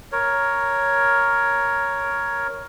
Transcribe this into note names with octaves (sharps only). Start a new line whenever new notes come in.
A#4 C#5